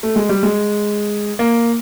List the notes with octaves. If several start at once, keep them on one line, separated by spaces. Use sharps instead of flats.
A3
G#3
G3
G#3
A#3